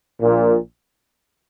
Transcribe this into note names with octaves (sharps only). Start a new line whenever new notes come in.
A#1 A#2